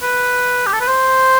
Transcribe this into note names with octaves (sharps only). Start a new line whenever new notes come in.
B4
G4
A4
B4
C5